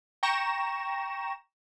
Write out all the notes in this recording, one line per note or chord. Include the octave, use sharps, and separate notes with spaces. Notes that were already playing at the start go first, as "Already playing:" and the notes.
G5 A#5 C#6 A#6 E7